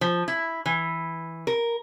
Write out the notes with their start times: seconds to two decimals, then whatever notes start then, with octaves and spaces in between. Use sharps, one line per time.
0.01 F3
0.28 E4
0.66 E3
1.47 A#4